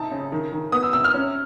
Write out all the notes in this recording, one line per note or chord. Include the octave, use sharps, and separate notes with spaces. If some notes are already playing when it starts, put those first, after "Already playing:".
Already playing: C3 D#4 A5
C#3
D#3
D#3
B3 D#6
E6
C3 E6
F6
C#4